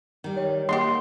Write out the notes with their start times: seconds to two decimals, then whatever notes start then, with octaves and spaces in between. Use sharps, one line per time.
0.24 D#3 G3
0.36 C#5 D#5 G5
0.69 G#3 A#3 D#4 G4 D#5 C6